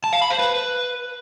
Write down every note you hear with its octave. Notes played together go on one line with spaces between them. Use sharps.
A5
F5
B5
C5
B4